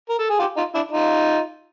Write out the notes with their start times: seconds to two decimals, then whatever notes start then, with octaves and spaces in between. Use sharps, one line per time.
0.09 A#4
0.19 A4
0.30 G#4
0.39 F4 G4
0.57 D#4 F4
0.75 D4 E4
0.92 D#4 F4